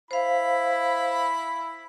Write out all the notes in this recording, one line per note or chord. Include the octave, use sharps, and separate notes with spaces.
E4 C5 F5 B5